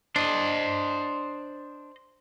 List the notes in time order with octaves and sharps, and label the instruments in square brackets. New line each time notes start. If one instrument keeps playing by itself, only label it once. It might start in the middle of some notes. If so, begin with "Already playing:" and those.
[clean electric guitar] D4 [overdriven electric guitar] C5 D#5